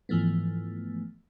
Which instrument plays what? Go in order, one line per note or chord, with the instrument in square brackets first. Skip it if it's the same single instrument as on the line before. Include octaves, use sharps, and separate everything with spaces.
[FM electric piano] G#2 E3 F3 A3 B3